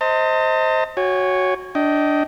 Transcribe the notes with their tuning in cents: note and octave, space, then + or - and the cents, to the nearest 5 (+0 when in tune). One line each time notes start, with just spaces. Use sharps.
C5 +0 D#5 +20 A5 +45
F#4 +0 C#5 +0 G#5 -40
D4 +0 D#5 +15 G5 -15